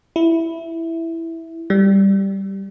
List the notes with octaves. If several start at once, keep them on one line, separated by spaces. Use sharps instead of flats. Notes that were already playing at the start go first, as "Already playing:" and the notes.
E4
G3